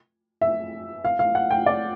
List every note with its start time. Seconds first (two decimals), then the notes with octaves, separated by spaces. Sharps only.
0.41 E5
1.05 F5
1.19 F5
1.35 F#5
1.51 G5
1.66 D5